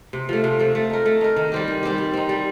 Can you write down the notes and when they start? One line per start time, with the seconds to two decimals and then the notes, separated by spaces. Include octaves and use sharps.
0.13 C3
0.29 F3 A3
0.44 C3
0.59 F3 A3
0.75 A3
0.90 D#4 A#4
1.06 A3
1.21 D#4 A#4
1.36 D#3
1.52 G3 C4 G4
1.68 D#3
1.83 G3 C4 G4
1.98 G3
2.13 C4 D#4
2.29 G3